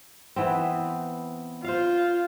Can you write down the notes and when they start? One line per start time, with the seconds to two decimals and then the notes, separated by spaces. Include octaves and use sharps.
0.36 E3 B3 C4
1.64 F4 C5 F5